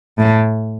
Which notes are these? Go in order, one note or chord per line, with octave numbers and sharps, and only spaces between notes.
A2